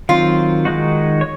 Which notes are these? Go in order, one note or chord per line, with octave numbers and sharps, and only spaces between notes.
D#3 F#3 C4 F4
D#3 G#3 D#4 F#4
C#5